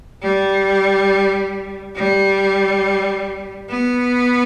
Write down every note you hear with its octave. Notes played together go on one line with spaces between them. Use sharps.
G3
G3
B3